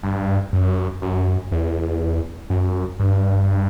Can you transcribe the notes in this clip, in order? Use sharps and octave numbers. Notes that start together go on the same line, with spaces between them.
G2
F#2
F#2
E2
F#2
G2